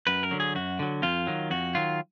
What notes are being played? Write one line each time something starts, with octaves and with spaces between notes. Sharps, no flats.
F#2 B4
A#4
D3 F#3
G#4
F#2 F#4
D3 F#3
F2 F4
D#3 F#3
F2 F#4
D#3 F#3 F4